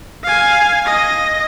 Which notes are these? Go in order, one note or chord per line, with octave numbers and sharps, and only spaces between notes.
F5 G#5
D#5